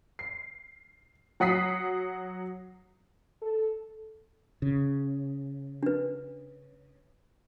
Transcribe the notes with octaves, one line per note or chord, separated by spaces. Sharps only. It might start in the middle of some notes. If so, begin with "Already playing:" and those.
C7
F#3 F#5 D#6 B6 C7
A4
C#3
D4 B4